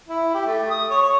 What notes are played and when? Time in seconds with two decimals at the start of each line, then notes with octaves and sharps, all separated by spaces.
0.09 E4
0.34 G4
0.47 A3
0.70 D#6
0.90 C#5
1.02 C#5